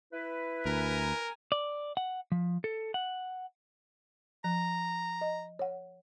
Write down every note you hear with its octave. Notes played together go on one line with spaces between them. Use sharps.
E4 B4
D2 A#4 G#5 A#5
D5
F#5
F3
A4
F#5
F3 A#5
D#5
C#5 F#5